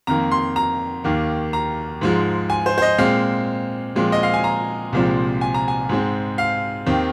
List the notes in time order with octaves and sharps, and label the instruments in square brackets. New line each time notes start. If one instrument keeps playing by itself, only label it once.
[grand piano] F2 D#3 A#3 A#5
C6
A#5
D#2 D#3 A#3
A#5
G#2 F3 G#3
G#5
C5
C5
D#5
A#2 G#3 C4 F5
A#2 F3 G#3 C4
D#5
F5
G#5
A#5
C2 A#2 F3 G#3 C4
G#5
A#5
G#5
G#2 G#3 C4
F5
D#2 D#3 C4